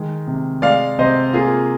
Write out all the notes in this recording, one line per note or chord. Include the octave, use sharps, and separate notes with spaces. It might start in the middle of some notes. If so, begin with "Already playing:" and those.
Already playing: D#3 G#3
C3
G#3 D5 F5
C3 C5 D#5
A#3 F4 G#4